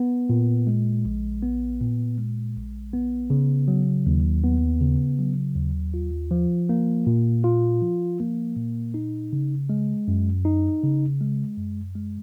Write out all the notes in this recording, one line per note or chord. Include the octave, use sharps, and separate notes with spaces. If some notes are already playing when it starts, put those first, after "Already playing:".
Already playing: B3
A#2
G#3
A#1
B3
A#2
G#3
A#1
B3
C#3
F#3
D#2
B3
C#3
F#3
D#2
F4
F3
A#3
A#2
F4
F3
A#3
A#2
D#4
C#3
G#3
F#2
D#4
C#3
G#3
F#2
G#3